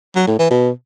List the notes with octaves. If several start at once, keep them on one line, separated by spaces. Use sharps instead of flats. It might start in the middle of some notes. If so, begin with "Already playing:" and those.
F#3
A2
E3
B2